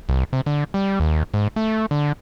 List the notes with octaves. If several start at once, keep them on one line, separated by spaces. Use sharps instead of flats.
C2
C3
D3
G3
D#2
G#2
A3
D3